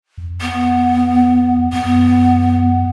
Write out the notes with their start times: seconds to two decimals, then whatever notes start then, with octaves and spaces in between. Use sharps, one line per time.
0.18 F2
0.41 B3
1.73 F#2 B3